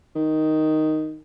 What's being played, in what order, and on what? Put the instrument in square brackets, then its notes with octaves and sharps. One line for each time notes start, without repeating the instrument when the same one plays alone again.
[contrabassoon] D#3